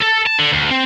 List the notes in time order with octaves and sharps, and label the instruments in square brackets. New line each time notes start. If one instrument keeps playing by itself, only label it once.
[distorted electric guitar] A4
A5
D3
D2
C4